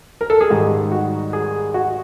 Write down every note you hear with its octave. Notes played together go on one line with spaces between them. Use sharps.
A#4
A4
G#4
G#2 D#3 G3 G4
F#4
G#4
F#4